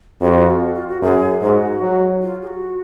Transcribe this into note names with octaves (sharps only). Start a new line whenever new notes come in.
F2 F#4
F4
F#4
F4
F#4
F#2 G#4
G#2 F#4
F#3
F4
G#4
F#4